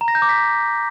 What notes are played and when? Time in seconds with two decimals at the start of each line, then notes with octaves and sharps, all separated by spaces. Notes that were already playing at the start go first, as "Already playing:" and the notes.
0.01 A#5
0.08 A#6
0.15 G6
0.22 D6
0.29 B6